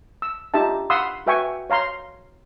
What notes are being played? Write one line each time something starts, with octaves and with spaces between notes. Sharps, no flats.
E6
D4 D#4 F4 G4 E5 A5
F5 F#5 B5 C6 D#6 E6
F#4 B4 E5 G5 G#5 C#6
C#5 F5 A#5 C6